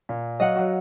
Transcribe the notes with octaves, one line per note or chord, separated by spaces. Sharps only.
A#2
F#3 D#5 F5 F#5
F#3 F#4